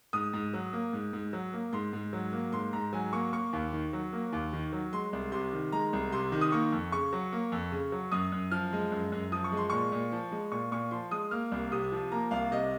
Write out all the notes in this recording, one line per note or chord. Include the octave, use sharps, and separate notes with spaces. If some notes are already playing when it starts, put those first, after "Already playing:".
G#2 D#6
G#2
F#3
A#3
G#2
G#2
F#3
A#3
G#2 C6
G#2
F#3
A#3
G#2 C6
G#2 A#5
F#3 G#5
A#3 C#6
A#3 C#6
D#2
D#3
F#3
A#3
D#2
D#3
F#3
G#3 C6
C2
C3 C6
D#3
G#3 A#5
C2
C3 C6
D#3
D#6
A#3 C#6
F2
C#3 C#6
F#3
A#3
F2
C#3
F#3
F#2 D#6
F#2
F3 F6
G#3
F#2
F#2
F3 D#6
C#6
G#3
C6
A#2 C#6
A#2
F3
G#3
A#2 C#6
A#2 C#6
F3 C6
G#3 D#6
A#3 F6
C2
C3 D#6
F3
A#3 A#5
C2 F5
C3 D#5